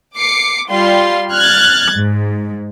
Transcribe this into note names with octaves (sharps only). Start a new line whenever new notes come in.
D6 C7 C#7
G3 F4 C6
F6 F#6 G#6 A6
G#2